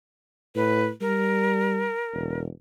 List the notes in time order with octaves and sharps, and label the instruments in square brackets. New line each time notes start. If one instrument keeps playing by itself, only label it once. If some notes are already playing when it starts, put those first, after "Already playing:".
[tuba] A2 [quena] B4
[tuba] G3 [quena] A#4
[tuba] E1